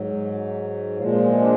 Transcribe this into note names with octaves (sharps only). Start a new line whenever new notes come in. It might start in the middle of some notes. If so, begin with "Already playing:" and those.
Already playing: G#2 F#3
A#2 F3 G#3 F4
D4
B3
D4